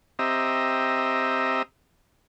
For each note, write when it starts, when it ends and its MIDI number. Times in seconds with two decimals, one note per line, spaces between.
0.19 1.62 60
0.19 1.62 67
0.19 1.62 75
0.19 1.62 76
0.19 1.62 82